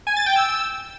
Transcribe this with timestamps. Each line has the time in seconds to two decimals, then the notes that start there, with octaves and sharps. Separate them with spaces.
0.07 G#5
0.17 A6
0.26 G5
0.36 E6